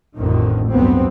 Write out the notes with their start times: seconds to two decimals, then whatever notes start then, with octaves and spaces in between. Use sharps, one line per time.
0.18 A1 F2 A2 D3 D#3
0.70 D2 G2 F#3 B3 C4